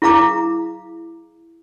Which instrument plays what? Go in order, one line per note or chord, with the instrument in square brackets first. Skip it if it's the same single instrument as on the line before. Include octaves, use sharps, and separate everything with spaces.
[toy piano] E4 G#4 F5 A#5 D6